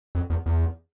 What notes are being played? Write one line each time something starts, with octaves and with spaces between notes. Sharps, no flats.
F2
E2
E2